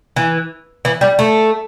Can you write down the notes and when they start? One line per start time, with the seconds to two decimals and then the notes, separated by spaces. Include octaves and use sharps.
0.16 E3
0.85 E3
1.01 G3
1.19 A3